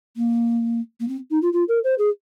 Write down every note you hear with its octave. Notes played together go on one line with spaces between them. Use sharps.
A#3
A#3
C4
D#4
F4
F4
A#4
C5
G#4